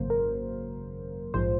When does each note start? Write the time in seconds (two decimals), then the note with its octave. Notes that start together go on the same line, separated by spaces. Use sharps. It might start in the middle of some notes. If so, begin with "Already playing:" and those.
Already playing: G#1 F#2 C#3 F#3 A#3 C5
0.10 A#4
1.34 A#1 G#2 F3 C5